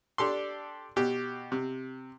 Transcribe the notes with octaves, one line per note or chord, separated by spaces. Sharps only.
D4 G4 A4 C6
B2 G4
C3